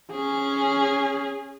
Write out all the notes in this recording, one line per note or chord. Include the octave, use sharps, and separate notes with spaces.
C#4 G#4